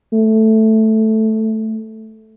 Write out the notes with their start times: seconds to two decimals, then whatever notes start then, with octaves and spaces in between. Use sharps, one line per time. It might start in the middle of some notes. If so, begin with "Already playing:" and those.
0.13 A3